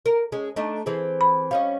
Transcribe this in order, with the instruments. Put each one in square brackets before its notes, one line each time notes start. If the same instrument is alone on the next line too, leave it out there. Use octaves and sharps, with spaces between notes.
[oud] A#4
G#3 C#4
A3 D4 D#4
E3 C4 G#4
[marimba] B5
[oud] G3 C#4 D#5 [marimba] F5